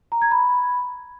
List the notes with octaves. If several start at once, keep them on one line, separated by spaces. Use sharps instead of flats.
A#5
G#6
B5